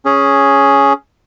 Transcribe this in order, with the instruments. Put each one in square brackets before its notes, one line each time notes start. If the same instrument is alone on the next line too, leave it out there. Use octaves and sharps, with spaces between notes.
[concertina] C#4 G#4